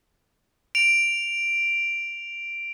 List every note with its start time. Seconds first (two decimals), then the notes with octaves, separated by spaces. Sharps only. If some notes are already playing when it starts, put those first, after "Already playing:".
0.75 D7 F7